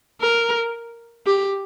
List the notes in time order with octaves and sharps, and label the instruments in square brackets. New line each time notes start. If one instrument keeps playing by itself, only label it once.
[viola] A#4
G4